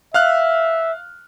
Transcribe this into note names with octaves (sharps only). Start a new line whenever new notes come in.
E5 F5 F6 F#6